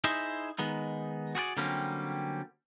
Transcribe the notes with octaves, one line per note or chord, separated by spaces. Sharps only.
D#4 E4 G#4 C5 D#5 E5
D#3 G#3 B3 D#4
F#4 G#4 B4 D5
D3 F#3 G3 A#3 C4 C#4